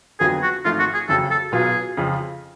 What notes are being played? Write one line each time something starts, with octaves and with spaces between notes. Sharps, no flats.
F2 D3 F#3 B3 F4 G#4
F#4
G#1 G#2 F3 A3 F4
F#4
G#4
F#1 F2 C#3 F#3 A4
A4
B1 B2 F#3 B3 F4 G#4
F2 C#3 F3